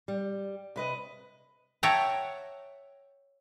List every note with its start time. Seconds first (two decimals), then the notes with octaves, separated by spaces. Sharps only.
0.08 G3
0.76 C3 B4 D#5
1.83 C#5 E5 F#5 G5 A5 A#5